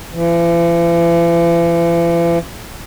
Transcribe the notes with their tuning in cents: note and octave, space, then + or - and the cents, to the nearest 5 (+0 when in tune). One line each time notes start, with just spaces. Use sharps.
E3 +45